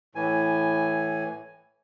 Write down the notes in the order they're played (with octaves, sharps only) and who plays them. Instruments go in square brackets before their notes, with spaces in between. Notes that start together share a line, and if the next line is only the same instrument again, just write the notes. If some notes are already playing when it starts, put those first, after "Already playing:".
[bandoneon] A2 E3 G#5